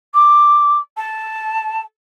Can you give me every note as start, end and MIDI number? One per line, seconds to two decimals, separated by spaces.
0.14 0.78 86
0.97 1.81 81